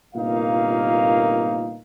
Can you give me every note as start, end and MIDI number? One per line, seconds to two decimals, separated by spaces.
0.14 1.77 31
0.14 1.77 36
0.14 1.77 46
0.14 1.77 58
0.14 1.77 63
0.14 1.77 77